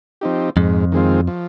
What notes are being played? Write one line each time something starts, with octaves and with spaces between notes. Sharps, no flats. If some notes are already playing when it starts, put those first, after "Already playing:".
F3 C4 D#4 G4
F2 G#2
D#3 G#3 C4 F4
F3